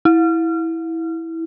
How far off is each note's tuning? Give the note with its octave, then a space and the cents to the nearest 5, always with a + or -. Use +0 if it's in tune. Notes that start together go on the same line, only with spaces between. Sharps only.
E4 -10